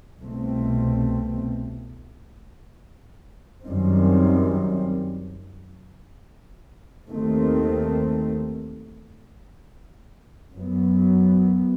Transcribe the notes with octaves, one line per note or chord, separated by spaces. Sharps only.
C2 B2 A3 C4
F#2 D#3 G3 C4
D#2 D#3 A3 C4
F#2 F#3 B3